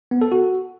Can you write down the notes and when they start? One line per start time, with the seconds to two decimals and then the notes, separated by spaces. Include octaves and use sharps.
0.11 B3
0.21 A4
0.32 F#4